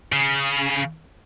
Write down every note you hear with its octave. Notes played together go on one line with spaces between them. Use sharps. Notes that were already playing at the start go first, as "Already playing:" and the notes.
C#3